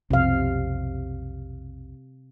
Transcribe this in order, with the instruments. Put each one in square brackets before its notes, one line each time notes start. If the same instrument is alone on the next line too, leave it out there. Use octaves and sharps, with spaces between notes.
[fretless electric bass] B1 F2 [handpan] C3 F5